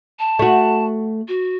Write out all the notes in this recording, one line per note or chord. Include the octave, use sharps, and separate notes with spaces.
A5
A3 F#4
F#4